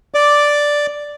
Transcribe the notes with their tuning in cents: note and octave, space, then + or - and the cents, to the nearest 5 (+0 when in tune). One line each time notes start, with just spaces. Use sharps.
D5 +0 D6 +0